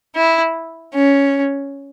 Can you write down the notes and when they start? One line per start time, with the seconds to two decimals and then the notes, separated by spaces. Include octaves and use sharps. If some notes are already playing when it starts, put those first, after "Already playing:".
0.16 E4
0.94 C#4